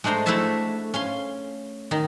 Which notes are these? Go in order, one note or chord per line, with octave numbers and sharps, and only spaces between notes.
G#3 A3 D4 C5 A#5
A3 E4 F#4 A4 E5 A5
C#4 F5 C6
D#3 D#4